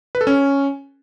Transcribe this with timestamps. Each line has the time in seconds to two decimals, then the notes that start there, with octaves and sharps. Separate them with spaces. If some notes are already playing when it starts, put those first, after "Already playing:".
0.15 B4
0.21 A4
0.27 C#4